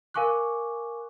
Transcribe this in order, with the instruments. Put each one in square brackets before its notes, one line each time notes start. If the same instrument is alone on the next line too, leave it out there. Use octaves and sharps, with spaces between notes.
[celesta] A#4 F5 G#5 C#6 D6 F#6